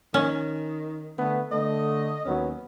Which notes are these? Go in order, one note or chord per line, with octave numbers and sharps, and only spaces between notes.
D#3 C#4
D3 A3 B3
D3 A3 D#5
D#2 F#3 B3 C#4